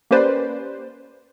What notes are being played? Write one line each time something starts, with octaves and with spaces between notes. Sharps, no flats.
A#3 C#4 G4 B4 C5 D5